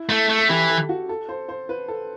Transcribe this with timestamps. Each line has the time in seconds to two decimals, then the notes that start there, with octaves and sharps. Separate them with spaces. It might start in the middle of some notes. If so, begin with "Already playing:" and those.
Already playing: E4
0.09 A3
0.29 A3
0.39 A4
0.49 E3 G4
0.69 A4
0.89 F#4
1.09 A4
1.29 C5
1.49 C5
1.69 B4
1.88 A4